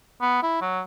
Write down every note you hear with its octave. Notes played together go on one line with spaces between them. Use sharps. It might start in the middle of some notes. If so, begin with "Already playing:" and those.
B3
E4
F#3